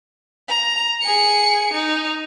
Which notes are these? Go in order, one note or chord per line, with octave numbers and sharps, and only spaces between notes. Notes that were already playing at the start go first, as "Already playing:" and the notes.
A#5
G#4 C#7
D#4